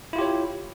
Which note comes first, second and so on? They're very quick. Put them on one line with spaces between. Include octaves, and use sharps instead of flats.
E4 F4 G4 C#5